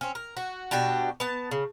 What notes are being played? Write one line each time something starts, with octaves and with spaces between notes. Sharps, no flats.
C4 C#4
A#4
F#4
B2 D4 F#4 G4
B3 A5
C#3